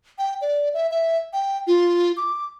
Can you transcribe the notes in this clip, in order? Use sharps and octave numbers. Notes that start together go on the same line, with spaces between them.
G5
D5
E5
E5
G5
F4
D6